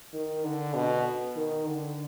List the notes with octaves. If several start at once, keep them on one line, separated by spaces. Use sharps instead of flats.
D#3
D3
B2
D#3
D3